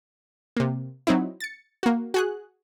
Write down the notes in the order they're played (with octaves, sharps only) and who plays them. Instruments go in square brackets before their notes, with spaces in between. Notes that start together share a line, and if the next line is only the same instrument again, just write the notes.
[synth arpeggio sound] C3 A#3
F#3 C4 D#4 E4
A6 C#7
A#3 F#4
F#4 G#4 F#6